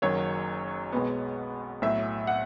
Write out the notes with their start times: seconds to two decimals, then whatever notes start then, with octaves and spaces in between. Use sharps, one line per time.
0.02 F#1 F#2 D#3 F#3 C#5
0.92 B1 B2 G#3 B3
1.82 B1 A2 F#3 E5
2.27 F#5